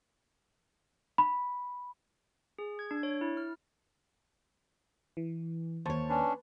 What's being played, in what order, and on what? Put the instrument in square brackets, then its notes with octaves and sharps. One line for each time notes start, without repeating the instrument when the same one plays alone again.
[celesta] B5
[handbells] G#4
G#6
D4
C#5
E4
F6
[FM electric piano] E3
[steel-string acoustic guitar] D#2 C#5 [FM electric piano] C5 A5 C#6
[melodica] C#4 D4 [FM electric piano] B4